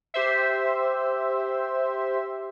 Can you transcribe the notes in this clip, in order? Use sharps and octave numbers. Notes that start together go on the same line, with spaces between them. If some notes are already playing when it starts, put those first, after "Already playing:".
G4 C5 E5